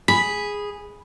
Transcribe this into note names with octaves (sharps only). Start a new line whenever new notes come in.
G#4 B5 B6